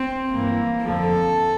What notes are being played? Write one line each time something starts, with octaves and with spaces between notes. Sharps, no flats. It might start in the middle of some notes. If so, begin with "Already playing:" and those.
Already playing: C4
G2 E3 A#3
F2 D3 F3 A4